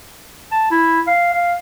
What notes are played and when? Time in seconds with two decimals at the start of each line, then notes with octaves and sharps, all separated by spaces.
0.51 A5
0.71 E4
1.07 F5
1.34 F5